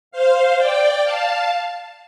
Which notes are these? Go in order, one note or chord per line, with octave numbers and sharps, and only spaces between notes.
C5 F5
D5 G5
F5 A5